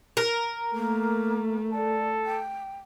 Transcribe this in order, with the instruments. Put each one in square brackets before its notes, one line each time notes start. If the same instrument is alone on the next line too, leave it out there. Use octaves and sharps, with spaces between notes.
[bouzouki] A#4
[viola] A3 [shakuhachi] A#3
[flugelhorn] A4 [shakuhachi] D5
[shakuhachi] G5